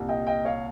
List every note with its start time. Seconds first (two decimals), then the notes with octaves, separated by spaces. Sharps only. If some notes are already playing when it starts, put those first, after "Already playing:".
Already playing: C2 A#2 G3
0.08 D#5 G5
0.27 D#5 G5
0.45 C#5 F5